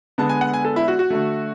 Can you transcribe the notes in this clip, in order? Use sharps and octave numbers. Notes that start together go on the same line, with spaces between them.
D3 G#3 B3 A5
G#5
F#5
G#5
A4
E4
F#4
F#4
D3 A3